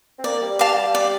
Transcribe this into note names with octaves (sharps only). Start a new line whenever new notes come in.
C4
A#3 D5
G3
G3 F5 A5 D6
G3
D5